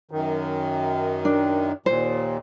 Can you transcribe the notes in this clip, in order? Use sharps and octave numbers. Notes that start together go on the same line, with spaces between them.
F#2 D#3
D4
D#2 A#2 C5